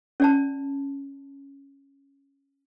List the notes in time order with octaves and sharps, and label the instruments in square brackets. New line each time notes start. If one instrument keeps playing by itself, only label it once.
[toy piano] C#4 D5 A5